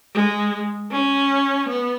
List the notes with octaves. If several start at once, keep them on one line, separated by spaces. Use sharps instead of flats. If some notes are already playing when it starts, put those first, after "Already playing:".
G#3
C#4
B3